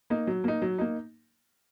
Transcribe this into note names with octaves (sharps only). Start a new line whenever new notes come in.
A#3 D#4
F#3
A#3 D#4
F#3
A#3 D#4